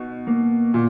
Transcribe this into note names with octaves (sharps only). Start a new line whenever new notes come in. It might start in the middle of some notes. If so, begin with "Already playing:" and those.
Already playing: B2 D#4
A#3
A#2